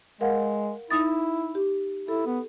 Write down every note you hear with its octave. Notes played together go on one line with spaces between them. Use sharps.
G#3 A#4 F5 F#5
D#4 E4 D#6 A6
G4
E4 A4
B3